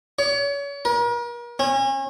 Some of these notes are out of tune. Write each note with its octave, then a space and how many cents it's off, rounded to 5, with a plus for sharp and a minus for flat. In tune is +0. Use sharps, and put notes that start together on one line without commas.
C#5 +35
A#4 +40
C#4 -35